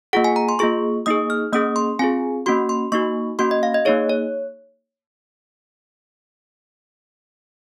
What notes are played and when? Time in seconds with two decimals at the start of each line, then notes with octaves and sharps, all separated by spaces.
0.13 A#3 F4 G#4 F#5
0.24 G#5
0.36 A#5
0.49 C6
0.59 A#3 F4 G#4 C#6
1.06 A#3 D#4 G#4 D#6
1.30 F6
1.53 A#3 C#4 G#4 D#6
1.76 C6
1.99 C4 F4 G#4 G#5
2.46 A#3 C#4 F#4 C6
2.69 C6
2.92 A#3 D#4 F#4 C#6
3.39 A#3 C#4 F#4 C6
3.51 D#5
3.63 F5
3.74 D#5
3.85 A#3 D#4 G#4 C#5
4.10 C#5